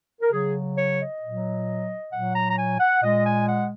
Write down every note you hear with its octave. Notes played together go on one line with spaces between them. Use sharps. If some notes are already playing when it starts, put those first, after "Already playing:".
A#4
C#3 F#3 G#4
C#5
D#5
A#2 F#3
A#2 F#3 F#5
A#5
A#5
G#5
F#5
A#2 G#3 D#5
G#5
F#5